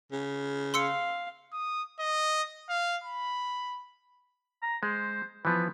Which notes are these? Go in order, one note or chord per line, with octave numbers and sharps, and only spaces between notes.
C#3
F5 C6 E6 C#7
D#6
D#5
F5
B5
A#5
G#3 C5
E3 F3 B3 B4